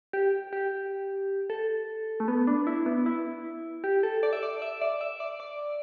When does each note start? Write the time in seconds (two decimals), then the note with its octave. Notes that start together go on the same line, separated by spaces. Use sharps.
0.13 G4
0.53 G4
1.50 A4
2.20 A3
2.28 B3
2.47 D4
2.67 E4
2.86 B3
3.06 E4
3.84 G4
4.03 A4
4.23 D5
4.33 E5
4.43 D5
4.62 E5
4.81 D5
5.01 E5
5.20 D5
5.40 D5